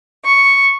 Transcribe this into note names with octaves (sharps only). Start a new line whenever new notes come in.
C#6